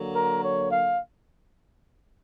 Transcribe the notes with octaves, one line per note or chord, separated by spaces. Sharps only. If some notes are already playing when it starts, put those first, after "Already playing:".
Already playing: D3 F#3 A#3
A#4
C#5
F5